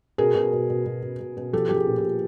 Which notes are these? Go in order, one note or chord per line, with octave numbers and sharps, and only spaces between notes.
B2 G#4 A#4
B2
B2
B2
B2
B2
B2
B2
F3 G4 A4
F3 G4
G#4
A#2
G4
A#2